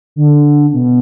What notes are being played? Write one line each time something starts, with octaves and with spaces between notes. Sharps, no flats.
D3
B2